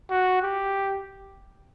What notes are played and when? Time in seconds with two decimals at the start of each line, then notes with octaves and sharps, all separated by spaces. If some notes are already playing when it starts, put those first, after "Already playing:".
0.10 F#4
0.42 G4